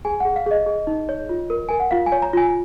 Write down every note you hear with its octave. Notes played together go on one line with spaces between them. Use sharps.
G#4 G#5
G#4 F#5
F5
G#4 D#5
G#4
D#4
C#5
F4
A#4
A#4 G#5
F#5
F4 F5
G#5
C#5
A#5
F4 G#5